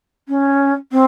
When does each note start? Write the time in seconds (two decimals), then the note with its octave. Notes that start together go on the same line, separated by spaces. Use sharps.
0.28 C#4
0.92 C4